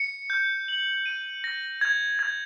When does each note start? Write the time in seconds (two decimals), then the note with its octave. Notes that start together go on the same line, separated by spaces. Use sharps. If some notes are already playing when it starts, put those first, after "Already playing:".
Already playing: C#7
0.30 G6
0.68 F#7
1.06 D#7
1.44 A#6
1.81 G#6
2.19 G#6